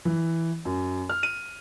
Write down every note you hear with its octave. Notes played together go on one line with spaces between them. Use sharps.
E3
F#2
F6
D#7